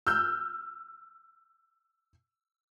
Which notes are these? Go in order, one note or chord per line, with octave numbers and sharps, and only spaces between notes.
E6 F6 G6